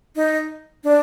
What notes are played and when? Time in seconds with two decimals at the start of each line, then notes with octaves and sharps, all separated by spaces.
0.16 D#4
0.84 D4